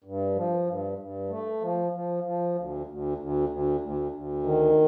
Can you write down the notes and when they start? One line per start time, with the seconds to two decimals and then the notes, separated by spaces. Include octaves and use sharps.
0.04 G2
0.36 F3
0.67 G2
0.98 G2
1.30 A3
1.61 F3
1.92 F3
2.24 F3
2.55 D2
2.87 D2
3.18 D2
3.49 D2
3.81 D2
4.12 D2
4.43 D#3